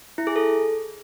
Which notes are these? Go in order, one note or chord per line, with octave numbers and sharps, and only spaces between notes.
E4
G#4
A4